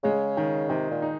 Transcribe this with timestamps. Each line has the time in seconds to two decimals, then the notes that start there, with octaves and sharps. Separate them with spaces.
0.04 C#3 G#3
0.37 D#3
0.69 C3 D#3
0.91 A#2
1.02 D#4